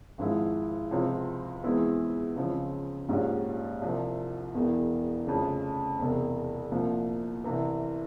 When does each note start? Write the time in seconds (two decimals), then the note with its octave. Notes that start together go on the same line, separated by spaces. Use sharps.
0.18 G#1 G#2 F3 G#3 E4
0.91 C#2 C3 F3 C4
1.64 E2 E3 G#3 C4 E4
2.36 C#2 C#3 F3 C4
3.09 A#1 G#2 G3 C#4
3.81 C2 C3 F3 C4
4.54 E1 E2 E3
5.27 F1 F2 C#3
5.99 E1 E2 C3
6.72 C2 A#2 F3
7.44 C2 C3 E3